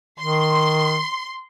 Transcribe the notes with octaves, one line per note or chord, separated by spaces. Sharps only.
D#3 C6